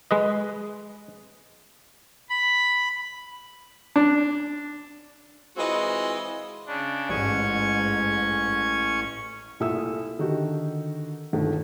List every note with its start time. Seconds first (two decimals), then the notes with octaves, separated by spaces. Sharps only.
0.11 G#3 B4 D#5
2.30 B5
3.96 D4
5.57 E3 G#3 C4 F4 F#4 D#5
6.66 C#3 D4
7.09 A1 G#2 C#4 C#6 G#6
9.60 C2 A#2 A3 E5 D#6 E6
10.19 D3 D#3 F#4 G4
11.33 G1 D#2 A3